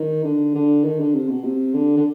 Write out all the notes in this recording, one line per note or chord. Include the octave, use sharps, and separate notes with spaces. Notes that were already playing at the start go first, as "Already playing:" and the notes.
Already playing: D#3
D3
D3
D#3
D3
C3
B2
C3
D3
D3